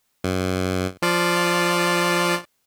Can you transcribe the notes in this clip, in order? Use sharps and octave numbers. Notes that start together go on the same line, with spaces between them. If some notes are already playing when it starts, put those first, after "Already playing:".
F#2
F3 F4 D5